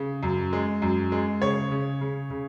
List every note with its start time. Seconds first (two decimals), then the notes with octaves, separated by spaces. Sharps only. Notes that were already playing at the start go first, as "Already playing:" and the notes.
Already playing: C#3
0.23 F#2
0.53 G#3
0.82 F#2
1.12 G#3
1.42 C#3 C#5
1.71 C#3
2.01 C#3
2.30 C#3